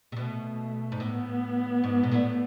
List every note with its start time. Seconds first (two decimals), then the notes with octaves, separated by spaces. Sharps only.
0.12 C3
0.17 B2 A3
0.92 G#2
1.00 A2 B3
1.84 G#2
2.03 B2
2.12 A2